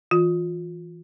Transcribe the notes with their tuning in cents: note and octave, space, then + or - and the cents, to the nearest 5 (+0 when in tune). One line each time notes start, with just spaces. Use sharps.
E3 +0 F4 +25